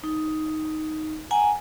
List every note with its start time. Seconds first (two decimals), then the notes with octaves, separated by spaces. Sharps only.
0.04 D#4
1.31 F#5 G#5 A#5